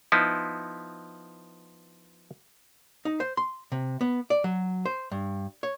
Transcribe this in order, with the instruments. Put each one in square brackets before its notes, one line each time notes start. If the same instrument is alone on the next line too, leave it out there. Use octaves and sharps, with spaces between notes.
[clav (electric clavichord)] F3 B3 D#4 E4
[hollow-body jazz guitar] D#4
C5
C6
C3
B3
D5
F#3
C5
G2
C#5